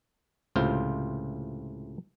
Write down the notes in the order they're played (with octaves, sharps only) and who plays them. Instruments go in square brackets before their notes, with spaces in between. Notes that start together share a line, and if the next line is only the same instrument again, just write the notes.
[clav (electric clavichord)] C#2 A2 C3 F4 C5